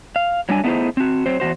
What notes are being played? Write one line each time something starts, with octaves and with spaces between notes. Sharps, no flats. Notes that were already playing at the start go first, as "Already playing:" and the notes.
F5
F#3 G3 D4 G#5
A3 B3 D#4 E4 G#4 C5
C4 F#4
F#3 C4 C5
E2 E3 F#4 C5